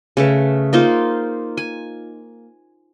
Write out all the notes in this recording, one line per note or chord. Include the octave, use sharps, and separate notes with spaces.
C#3 A3 B4
A#3 D#4 F4 C5
G#5